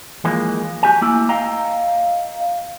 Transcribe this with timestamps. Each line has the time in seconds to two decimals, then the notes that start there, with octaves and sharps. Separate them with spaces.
0.25 E3 F3 G#3 A#3
0.83 F#4 G4 G#5
1.01 A3 A#3 E4
1.29 D#5 F5 G5 A#5